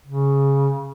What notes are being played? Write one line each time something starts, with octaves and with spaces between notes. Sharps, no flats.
C#3